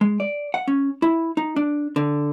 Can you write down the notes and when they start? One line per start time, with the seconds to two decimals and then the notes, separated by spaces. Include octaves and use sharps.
0.01 G#3
0.20 D5
0.54 F#5
0.68 C#4
1.02 E4
1.37 D#4
1.56 D4
1.96 D3